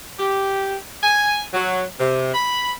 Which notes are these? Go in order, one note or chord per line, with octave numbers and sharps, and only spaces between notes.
G4
G#5
F#3
C3
B5